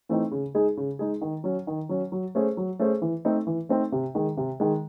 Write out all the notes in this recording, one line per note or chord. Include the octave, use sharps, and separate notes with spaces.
E3 A3 C4 D#4
C#3
G#3 D#4 G#4
C#3
G#3 D#4 G#4
D#3
F#3 C#4
D#3
F#3 C#4
F#3
A3 C#4 G#4 C5
F#3
A3 C#4 G#4 C5
E3
A3 C4 D#4
E3
A3 C4 D#4
C3
D#3 G#3
C3
D#3 G#3